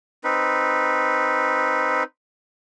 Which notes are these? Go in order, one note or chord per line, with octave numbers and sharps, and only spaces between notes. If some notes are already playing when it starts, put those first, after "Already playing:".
C4 D#4 B4